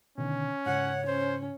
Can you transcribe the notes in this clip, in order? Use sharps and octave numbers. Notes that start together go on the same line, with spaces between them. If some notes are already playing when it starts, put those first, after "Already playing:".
B2 D3 D#3 C#4
G#2 C#3 C#5 F#5
C#4 C5